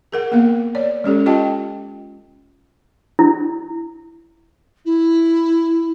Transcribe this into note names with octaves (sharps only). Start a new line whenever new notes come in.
G#4 A#4 F#5
A#3 B3 A#4 F5
C#5 D5
G#3 C#4 G4 A4
F4 G4 D#5 G5 A5
E4
E4